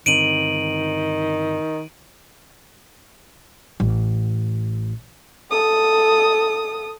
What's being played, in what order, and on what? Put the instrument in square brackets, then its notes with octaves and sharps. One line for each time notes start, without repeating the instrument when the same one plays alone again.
[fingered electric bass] G2 D3 C4 [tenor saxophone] D#3 [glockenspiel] D7 D#7 F#7
[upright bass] A1
[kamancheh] A4 D#6